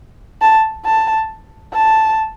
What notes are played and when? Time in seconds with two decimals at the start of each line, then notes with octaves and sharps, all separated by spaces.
0.42 A5
0.85 A5
1.74 A5